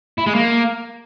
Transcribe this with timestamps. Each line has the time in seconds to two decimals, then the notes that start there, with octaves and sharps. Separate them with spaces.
0.18 E4
0.26 G#3
0.35 A#3